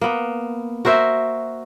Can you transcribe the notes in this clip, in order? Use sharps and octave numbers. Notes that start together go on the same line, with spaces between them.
A#3 B3
F#4 A#4 C5 E5